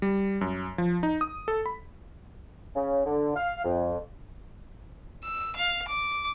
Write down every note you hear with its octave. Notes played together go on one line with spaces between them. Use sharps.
G3
F#2
F3
D#4
D#6
A4
B5
C#3
D3
F5
F2
E6
F5
D6